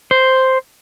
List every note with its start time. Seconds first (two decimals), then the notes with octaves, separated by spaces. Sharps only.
0.11 C5